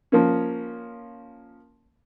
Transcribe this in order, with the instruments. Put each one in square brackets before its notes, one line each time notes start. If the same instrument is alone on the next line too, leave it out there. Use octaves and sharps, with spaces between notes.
[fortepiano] F3 A#3 C#4